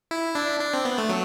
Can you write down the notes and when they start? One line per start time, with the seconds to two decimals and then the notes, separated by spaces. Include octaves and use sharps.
0.11 E4
0.35 D4
0.60 D4
0.73 C4
0.85 B3
0.98 A3
1.09 F#3